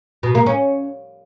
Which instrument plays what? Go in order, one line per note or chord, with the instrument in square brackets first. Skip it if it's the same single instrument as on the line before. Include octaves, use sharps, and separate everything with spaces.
[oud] B2
A#3
C#4